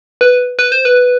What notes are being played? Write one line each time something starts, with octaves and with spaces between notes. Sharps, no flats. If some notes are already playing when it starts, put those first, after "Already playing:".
B4
B4
C5
B4